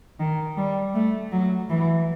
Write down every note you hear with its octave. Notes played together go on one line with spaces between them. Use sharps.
D#3
G3
A3
F#3
E3